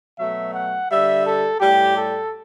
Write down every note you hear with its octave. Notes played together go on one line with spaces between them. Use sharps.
B2 F#3 A3 E5
F#5
D3 G3 E5
A4
A2 G3 G4
A4